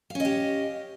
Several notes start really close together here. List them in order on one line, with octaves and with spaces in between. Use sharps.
F5 C#4 D#5 G4